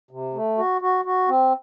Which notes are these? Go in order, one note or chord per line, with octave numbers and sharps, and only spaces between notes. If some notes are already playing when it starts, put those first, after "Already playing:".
C3
A3
F#4
F#4
F#4
C4